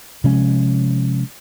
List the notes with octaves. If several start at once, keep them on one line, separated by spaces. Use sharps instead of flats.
C3 F3 G#3 C#4